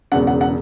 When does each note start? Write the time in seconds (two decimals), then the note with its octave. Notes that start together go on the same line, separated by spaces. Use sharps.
0.12 E1 E2 C#3 F#5
0.27 F#5
0.41 F#5